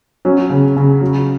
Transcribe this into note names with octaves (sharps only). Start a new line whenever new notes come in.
F#3 C#4
C#3
C#3
F#3